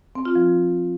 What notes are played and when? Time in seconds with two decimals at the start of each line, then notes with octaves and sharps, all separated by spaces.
0.15 C4
0.25 F4
0.35 F3